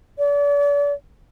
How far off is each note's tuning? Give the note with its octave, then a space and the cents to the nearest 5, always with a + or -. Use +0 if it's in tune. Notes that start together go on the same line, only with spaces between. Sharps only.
D5 -40